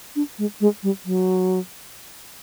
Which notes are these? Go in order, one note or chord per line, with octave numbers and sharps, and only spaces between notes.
D4
G#3
G#3
G3
F#3